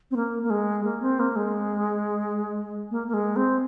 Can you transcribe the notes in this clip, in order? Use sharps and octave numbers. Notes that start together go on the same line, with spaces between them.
C4
A#3
A#3
G#3
A#3
C4
A#3
G#3
A#3
A#3
G#3
C4